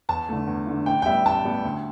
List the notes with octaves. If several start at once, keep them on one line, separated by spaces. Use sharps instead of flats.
E2 A5
D3 A3
E2
D3 A3
A1 G5
G5
A2 G3 B3 E5
A1 A5
A2 G3 B3
D2